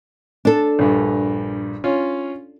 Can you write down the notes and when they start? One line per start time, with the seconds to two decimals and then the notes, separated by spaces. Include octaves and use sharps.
0.45 D4 A4
0.79 A#1 G2
1.84 C#4 F4